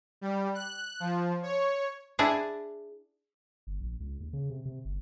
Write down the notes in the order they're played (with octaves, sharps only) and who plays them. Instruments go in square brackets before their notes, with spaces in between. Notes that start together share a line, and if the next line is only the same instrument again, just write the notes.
[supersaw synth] G3
F#6
F3
C#5
[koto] D4 E4 G#4
[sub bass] G1
A#1
C#2
D#2
C#3
C3
C3
G1